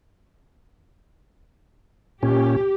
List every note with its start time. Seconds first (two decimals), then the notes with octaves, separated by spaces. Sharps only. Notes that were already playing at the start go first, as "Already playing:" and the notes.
2.23 A#2 C#4 G4